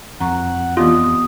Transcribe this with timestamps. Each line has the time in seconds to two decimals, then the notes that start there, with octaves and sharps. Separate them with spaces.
0.21 F2 F#5 A#5 C#6
0.77 E3 B3 F4 G4 D#5